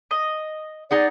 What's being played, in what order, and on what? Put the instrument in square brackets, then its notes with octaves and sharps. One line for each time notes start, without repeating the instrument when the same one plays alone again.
[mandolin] D#5
[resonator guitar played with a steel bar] D#4 G#4 F#5 [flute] D5